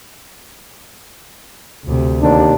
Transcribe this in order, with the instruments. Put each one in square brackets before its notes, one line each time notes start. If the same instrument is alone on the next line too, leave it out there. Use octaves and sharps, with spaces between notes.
[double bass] D2 C3
[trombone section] D#2 D4